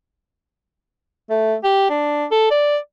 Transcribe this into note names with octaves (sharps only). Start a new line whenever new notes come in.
A3
G4
D4
A4
D5